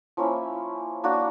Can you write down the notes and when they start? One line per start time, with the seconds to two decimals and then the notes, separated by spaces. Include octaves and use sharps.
0.17 F3 A#3 C#4 E4
1.04 A#3 D4 F#4